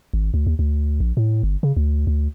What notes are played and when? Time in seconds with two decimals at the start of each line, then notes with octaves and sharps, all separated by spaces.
0.13 G#1
0.34 D2
0.47 D#2
0.59 D2
1.00 A#1
1.17 A2
1.43 G1
1.63 C#3
1.77 D2
2.07 D2